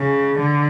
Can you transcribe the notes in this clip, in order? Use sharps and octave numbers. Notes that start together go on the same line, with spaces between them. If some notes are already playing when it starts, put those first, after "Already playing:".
Already playing: C#3
D3